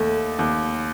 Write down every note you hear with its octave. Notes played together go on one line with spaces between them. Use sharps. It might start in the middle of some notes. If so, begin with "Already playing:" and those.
Already playing: D#2 A3
D#2